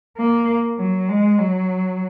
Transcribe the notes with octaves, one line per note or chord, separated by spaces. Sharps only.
A#3
F#3
G#3
F#3